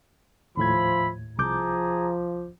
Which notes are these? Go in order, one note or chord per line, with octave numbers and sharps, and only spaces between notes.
D#2 A2 F3 C5 E5 B5 G#6
C2 F3 G#4 A5 A#5 D6 G6